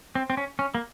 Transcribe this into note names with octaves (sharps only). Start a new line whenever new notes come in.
C4
C4
C#4
C#4
A#3